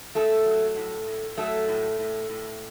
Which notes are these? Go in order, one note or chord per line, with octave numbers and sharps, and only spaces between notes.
A2 A3 A4
F#3
A2
A2
F#3 A3 A4
A2
A2
A2